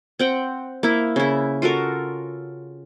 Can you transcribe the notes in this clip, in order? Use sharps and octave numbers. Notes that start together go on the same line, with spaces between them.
C4 F#5 G5
A#3 E4
C#3 E4
F4 F#4 A4 A#4